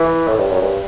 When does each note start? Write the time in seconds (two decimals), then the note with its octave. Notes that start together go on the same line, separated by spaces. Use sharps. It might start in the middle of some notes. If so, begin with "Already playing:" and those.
Already playing: E3
0.27 A2
0.39 G2
0.51 F#2
0.62 G2